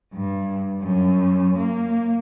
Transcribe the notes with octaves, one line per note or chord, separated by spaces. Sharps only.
G2
F#2
A#3